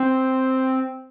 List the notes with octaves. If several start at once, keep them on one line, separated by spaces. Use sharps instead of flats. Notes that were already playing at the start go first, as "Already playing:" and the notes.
Already playing: C4